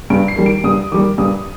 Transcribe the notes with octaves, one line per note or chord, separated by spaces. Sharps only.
G2 D7
C7
D#3 G3 A#3
D7
G2 D#6
D#3 G3 A#3 D6
G2 D#6